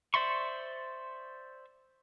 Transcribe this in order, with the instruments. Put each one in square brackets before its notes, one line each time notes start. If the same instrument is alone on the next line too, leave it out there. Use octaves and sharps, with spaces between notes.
[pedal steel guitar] C5 D5 E5 C6 C#6